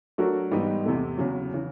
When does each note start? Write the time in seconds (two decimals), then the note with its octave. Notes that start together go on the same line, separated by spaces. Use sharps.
0.18 F#3 A3 D4 F#4 A#4
0.51 G#2 E3 G3 B3 D#4
0.85 E2 C3 E3 A3
1.18 E2 C#3 F#3
1.54 C#3 E3